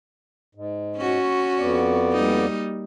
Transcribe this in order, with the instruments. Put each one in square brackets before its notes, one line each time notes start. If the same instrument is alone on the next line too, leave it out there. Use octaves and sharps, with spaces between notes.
[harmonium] G#2
[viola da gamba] C#4 F#4
[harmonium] F2 B3 D5
[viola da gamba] G3 A#3 D#4